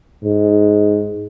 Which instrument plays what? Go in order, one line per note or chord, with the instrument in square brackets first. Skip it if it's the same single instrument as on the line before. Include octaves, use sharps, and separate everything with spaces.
[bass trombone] G#2